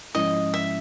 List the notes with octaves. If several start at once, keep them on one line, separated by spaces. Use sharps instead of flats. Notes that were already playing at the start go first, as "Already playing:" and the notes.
G#2 F3 G#3 C#4 E4 D#5
E5